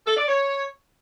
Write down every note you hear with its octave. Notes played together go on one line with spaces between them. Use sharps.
A4
D5
C#5